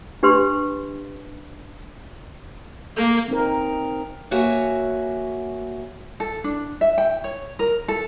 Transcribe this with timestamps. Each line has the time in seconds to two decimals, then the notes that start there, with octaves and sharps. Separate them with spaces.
0.23 D4 G4 B4 C6
2.96 A#3
3.28 C4 D#4 A#4
4.31 A#3 F#4 C#5 E5 G#5
6.20 A4
6.44 D4
6.81 E5
6.98 G5
7.24 C#5
7.59 A#4
7.88 A4